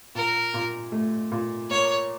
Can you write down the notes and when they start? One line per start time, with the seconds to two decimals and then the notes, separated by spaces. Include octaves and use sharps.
0.15 A#2 A#4
0.54 A#2
0.92 A3
1.32 A#2
1.70 A#3 C#5